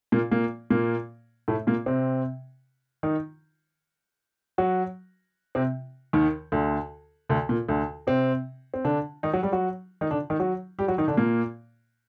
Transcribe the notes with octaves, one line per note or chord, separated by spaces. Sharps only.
A#2 A#3
A#2 A#3
A#2 A#3
A2 A3
A#2 A#3
C3 C4
D#3 D#4
F#3 F#4
C3 C4
D#2 D#3
D2 D3
D2 D3
A#2
D2 D3
C3 C4
C4
D3 D4
D#3 D#4
F#3 F#4
G3 G4
F#3 F#4
D#3 D#4
D3 D4
D#3 D#4
F#3 F#4
G3 G4
F#3 F#4
D#3 D#4
D3 D4
A#2 A#3